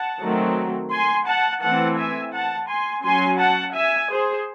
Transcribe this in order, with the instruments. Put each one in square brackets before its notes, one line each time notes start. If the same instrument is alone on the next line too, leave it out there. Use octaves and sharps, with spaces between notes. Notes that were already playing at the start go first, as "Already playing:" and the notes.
Already playing: [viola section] F#5 A5
D#3 F#3 A3 C4
G#5 C6
F#5 A5
E3 A3 C4 F#5 A5
E5 G#5
F#5 A5
G#5 C6
F#3 C#4 G#5 C6
F#5 A5
E5 G#5
G#4 C5